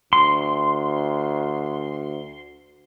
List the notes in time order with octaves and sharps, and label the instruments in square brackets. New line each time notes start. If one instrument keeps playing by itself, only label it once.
[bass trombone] D2 [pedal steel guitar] C6